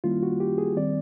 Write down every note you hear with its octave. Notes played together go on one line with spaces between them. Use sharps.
D#3 G3 A#3 C#4 E4 F4
F#4
G4
G#4
D#3 G3 C4 D5